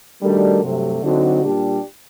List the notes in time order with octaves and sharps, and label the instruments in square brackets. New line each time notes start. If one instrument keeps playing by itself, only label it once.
[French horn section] D#3 A3 D4 F#4 A#4 [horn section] G3
[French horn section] G2 F#3 A3 [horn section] C3
[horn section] D3 [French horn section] F#3 C4 D#4 F#4
[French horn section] A#2 G3 D4 G4